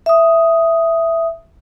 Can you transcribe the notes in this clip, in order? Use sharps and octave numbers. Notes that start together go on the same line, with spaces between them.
E5 D#6